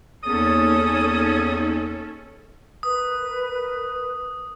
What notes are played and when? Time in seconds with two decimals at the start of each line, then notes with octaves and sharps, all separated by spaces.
0.24 E2 A#3 C#4 D#4 A4 D#6
2.83 A#4 B4 D#6